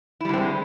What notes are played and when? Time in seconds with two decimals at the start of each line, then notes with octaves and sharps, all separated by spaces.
0.20 E4
0.25 G3
0.29 D3
0.33 C4
0.38 G#3